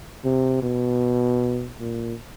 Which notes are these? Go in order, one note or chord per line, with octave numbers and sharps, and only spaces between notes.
C3
B2
A#2